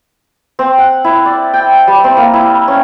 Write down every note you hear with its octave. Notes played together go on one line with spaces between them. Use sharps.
C4
F#5
E4
D5
G5
G3
C4
A#3
E4
C#4